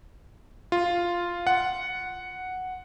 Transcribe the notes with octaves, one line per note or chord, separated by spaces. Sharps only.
F4
F#5